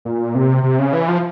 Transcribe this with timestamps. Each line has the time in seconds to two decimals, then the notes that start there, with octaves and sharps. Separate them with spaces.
0.05 A#2
0.35 C3
0.63 C3
0.79 C#3
0.93 E3
1.08 F3